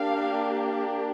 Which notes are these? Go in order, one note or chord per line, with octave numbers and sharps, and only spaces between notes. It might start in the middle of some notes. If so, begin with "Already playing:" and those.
Already playing: A#3 D4 G4 F5